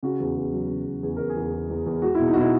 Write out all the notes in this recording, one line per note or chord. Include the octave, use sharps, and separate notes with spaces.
C#3 F#4
E2
E2
F#3
C#3
E2
E2 G#4
E2 A#4
G#4
E2
E2
E2
E2
G#3 F#4
E4
B2
D#4
F#4
B2 E4